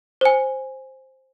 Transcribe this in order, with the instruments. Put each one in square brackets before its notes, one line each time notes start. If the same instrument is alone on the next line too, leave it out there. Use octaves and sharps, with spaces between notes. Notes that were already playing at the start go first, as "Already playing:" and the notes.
[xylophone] C5 G#5